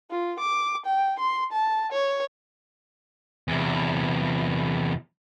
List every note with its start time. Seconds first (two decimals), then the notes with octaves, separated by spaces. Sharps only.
0.11 F4
0.40 D6
0.86 G5
1.19 C6
1.52 A5
1.92 C#5
3.48 E2 C3